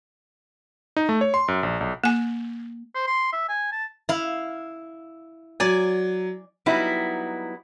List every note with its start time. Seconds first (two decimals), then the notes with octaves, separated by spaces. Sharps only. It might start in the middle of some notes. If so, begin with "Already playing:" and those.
0.97 D#4
1.09 A3
1.21 C#5
1.34 C6
1.48 F#2
1.63 A#1
1.81 B1
2.04 A#3 G#5
2.95 C5
3.07 C6
3.33 E5
3.49 G#5
3.72 A5
4.09 E4 F5
5.60 F#3 D5 G#5
6.66 F#3 G3 B3 D#4 E4